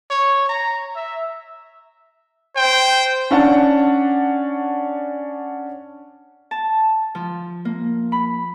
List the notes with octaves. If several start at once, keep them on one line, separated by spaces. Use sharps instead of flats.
C#5
A#5
E5
C5 G5
C#4 D4 F#5 A5
A5
F3
A#3
B5